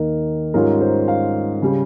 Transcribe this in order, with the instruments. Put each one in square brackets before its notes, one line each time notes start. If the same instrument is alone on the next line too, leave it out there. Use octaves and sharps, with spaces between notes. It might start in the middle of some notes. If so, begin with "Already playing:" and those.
Already playing: [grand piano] D#2 D#3 A#3 D#4 A#4
G#2 G3 C#4 F4 A#4
C5
F5
C#3 G3